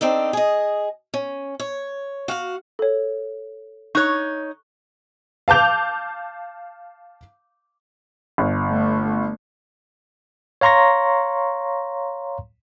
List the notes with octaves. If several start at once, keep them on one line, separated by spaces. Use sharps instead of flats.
C4 D4 D#4 A4
G#4 D#5
C#4
C#5
F#4 F5 F#5
A4 C#5
D#4 C#5 C#6 F#6
F5 A5 D6 G6 F7
G1
A3
C#5 F5 A#5 C6 C#6 A#6